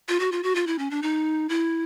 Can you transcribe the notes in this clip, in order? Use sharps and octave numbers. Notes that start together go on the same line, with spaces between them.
F4
F#4
F4
F#4
F4
E4
C#4
D4
D#4
E4